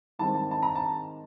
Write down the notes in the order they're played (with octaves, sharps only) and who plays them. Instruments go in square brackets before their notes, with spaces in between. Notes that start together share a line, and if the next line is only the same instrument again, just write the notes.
[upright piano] G#2 D#3 G3 C4 A5
A5
A5
A#5
A5